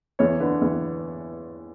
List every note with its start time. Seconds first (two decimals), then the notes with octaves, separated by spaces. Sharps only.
0.19 E2 C#5
0.40 D3 B4
0.61 E2